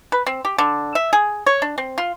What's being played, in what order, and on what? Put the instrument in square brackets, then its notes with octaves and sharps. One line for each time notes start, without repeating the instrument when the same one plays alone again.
[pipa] B4
C4
G4
D3
E5
G#4
C#5
D4
C4
F4